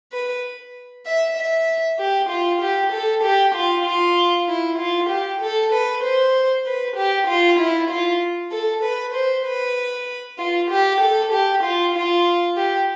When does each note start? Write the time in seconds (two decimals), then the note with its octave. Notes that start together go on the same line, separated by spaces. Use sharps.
0.12 B4
1.06 E5
1.37 E5
1.99 G4
2.29 F4
2.61 G4
2.92 A4
3.23 G4
3.55 F4
3.85 F4
4.48 E4
4.78 F4
5.09 G4
5.41 A4
5.73 B4
6.03 C5
6.66 B4
6.96 G4
7.27 F4
7.59 E4
7.90 F4
8.52 A4
8.83 B4
9.14 C5
9.45 B4
10.38 F4
10.70 G4
11.00 A4
11.33 G4
11.64 F4
11.94 F4
12.56 G4